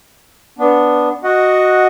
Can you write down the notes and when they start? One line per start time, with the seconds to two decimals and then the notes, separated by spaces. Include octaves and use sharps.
0.59 B3 D4
1.24 F#4 D#5 F#5